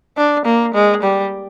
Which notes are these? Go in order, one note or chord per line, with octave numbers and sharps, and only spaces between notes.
D4
A#3
G#3
G3